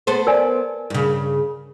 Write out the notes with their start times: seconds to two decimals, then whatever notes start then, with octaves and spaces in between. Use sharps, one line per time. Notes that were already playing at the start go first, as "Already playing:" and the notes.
0.07 B3 A4 C5
0.27 A#4 D5 G#5
0.90 G2 C#3